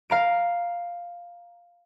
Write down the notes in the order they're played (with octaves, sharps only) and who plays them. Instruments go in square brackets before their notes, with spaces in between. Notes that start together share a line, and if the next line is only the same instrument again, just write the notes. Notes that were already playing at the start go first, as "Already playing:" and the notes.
[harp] F5 A#5 D7